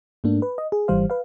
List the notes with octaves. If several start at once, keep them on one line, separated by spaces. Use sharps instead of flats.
G#2 A3 A#3 D4
B4
D#5
G#4
G#1 E3 G3 C5 F5
B4 F5